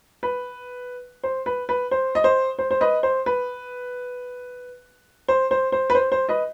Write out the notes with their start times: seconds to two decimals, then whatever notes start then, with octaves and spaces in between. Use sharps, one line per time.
0.23 B4
1.23 C5
1.46 B4
1.69 B4
1.91 C5
2.15 D#5
2.24 C5
2.59 C5
2.71 C5
2.81 B4 D#5
3.03 C5
3.26 B4
5.28 C5
5.51 C5
5.72 C5
5.90 B4
5.95 C5
6.12 C5
6.29 B4 D#5